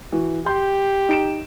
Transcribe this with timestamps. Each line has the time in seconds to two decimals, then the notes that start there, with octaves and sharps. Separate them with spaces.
0.12 E3 F#4
0.46 G4 C6 G6
1.09 D#4 D7 E7